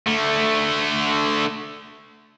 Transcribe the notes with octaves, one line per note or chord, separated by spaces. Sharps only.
D3 A3